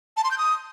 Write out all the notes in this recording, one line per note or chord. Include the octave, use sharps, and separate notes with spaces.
A5
C6
G6
D#6